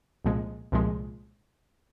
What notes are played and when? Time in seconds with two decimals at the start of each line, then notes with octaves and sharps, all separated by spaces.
0.24 C2 A#2 F3 G#3
0.72 C2 A#2 F3 G#3